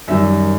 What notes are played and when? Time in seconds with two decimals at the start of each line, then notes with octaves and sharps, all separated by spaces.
0.08 F#2 D#3 G3 E5